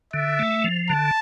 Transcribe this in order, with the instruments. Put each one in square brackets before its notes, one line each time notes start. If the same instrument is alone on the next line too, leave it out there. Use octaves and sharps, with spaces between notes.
[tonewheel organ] D3 [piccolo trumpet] E5
[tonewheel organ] A3
F3
[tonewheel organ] D3 [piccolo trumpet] A5